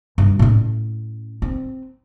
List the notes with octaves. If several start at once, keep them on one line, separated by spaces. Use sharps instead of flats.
G2
A2 C#4
C4